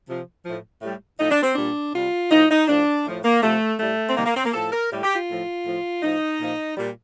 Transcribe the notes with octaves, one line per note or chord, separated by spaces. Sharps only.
C3 F3
A2 F3
A2 G3
A2 F3 D#4
D4
C4
A#2 G3 D4
C3 G3 F4
A2 F3 D#4
D#4
A2 F3 D4
A2 F3
A#3
C3 F3 A3
A2 G3 A3
C4
C3 D#3 G3 A#3
A#3
C4
A#3
A2 F3 A4
A#4
A2 G3
G4
F4
A2 F3
A2 F3
A2 F3 D#4
A#2 F3
A#2 G3